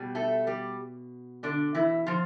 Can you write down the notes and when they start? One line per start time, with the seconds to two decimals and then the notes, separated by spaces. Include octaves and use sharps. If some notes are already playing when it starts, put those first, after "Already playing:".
Already playing: B2 G3
0.15 A3 A4
0.47 G3 G4
1.43 D3 D4
1.75 E3 E4
2.07 F3 F4